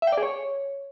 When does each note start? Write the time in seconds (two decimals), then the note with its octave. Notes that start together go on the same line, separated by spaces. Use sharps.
0.02 E5
0.07 G5
0.12 D5
0.18 G#4
0.23 C#5